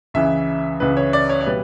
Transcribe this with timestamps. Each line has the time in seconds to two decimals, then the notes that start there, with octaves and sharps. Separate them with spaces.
0.14 C#2 C#3 E3 E5
0.80 C#2 C#3 E3 B4
0.97 C#5
1.13 D5
1.29 C#5
1.41 C#5
1.46 B2 G3 B4